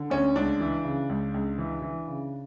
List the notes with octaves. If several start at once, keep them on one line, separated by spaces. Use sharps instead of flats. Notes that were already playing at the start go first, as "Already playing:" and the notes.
Already playing: D3
D2 C#4
C#2 D4
E3
C#3
C#2
C#2
E3
E3
C#3